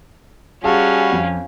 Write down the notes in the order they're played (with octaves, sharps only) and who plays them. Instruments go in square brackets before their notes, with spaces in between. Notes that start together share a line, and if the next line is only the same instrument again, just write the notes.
[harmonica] G3 F#4 [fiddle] C#4 [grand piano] G#4 A5 [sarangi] F5
[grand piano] F2